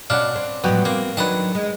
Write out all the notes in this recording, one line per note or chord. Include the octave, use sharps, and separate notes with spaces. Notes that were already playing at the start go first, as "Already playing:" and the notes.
B2 C#4 D4 F5 F#5
C4
A2 F3 F#3 B3 F#4 G5
A#3 C4
D#3 F#3 D4 B4 A5 D#6
G#3